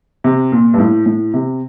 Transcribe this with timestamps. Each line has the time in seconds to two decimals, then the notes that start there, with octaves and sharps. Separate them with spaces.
0.24 C3
0.52 A#2
0.74 G2
0.78 A2
1.06 A2
1.34 C3